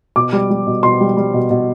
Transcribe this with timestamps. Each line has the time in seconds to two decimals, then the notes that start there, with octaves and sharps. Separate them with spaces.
0.16 B2 D6
0.33 G3
0.50 G3
0.67 B2
0.83 B2 C6
1.01 G3
1.17 G3
1.34 B2
1.50 B2